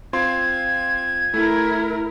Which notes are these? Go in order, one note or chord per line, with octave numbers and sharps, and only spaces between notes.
C4 F4 C6 G#6
A3 E4 A#4